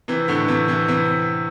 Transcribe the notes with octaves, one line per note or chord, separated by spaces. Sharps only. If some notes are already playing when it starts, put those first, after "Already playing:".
C3 E3
A2 D3
C3 E3
C3 E3
C3 E3